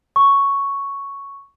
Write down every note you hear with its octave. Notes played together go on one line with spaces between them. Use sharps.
C#6